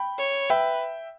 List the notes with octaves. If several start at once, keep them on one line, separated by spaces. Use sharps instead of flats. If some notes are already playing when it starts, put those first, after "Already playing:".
Already playing: G5 B5
C#5
B4 E5 G5